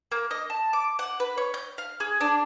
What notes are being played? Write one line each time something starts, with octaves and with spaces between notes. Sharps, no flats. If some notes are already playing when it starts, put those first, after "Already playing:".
A#3
D#5
A5
D6
F#5
B4
C#5
G6
F5
G#4
D4